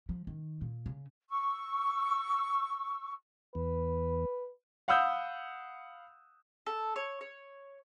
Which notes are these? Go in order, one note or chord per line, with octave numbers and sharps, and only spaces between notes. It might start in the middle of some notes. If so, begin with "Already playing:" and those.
F3
D#3
A#2
C#3
C#6 E6
E2 B4
F5 F#5 B5 D#6 E6 G6
A4
C#5
C#5